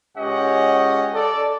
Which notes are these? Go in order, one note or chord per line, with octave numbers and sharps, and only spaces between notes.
C#2 C#4 G4 C#5 D#5 F#5
A4 D5